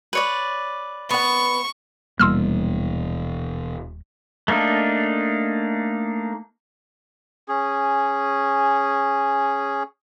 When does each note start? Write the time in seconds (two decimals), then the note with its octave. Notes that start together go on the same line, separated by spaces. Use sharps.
0.13 B4 C#5 D5
1.11 B3 F#5 C#6
2.19 D#1 B2 E3 G3 A#3 C6 E6 F6
4.48 A3 A#3 D4 D#4
7.49 C#4 G#4